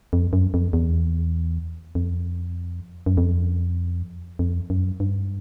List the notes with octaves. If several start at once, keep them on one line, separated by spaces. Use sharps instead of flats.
F2
F#2
F2
E2
F2
F#2
F2
F2
F#2
G2